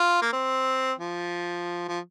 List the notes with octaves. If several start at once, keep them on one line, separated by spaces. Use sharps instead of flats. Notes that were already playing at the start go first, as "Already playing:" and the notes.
Already playing: F4
A#3
C4
F3
F3